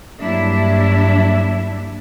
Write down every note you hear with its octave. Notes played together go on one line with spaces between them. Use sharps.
G2 F#3 A#3 D4 E4 E5